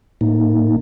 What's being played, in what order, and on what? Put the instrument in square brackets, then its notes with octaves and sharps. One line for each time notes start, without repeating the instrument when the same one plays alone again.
[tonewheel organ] A2 A#3 D#4